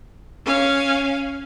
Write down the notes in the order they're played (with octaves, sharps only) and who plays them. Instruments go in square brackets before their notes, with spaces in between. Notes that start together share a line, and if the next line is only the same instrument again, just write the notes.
[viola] C#4 F5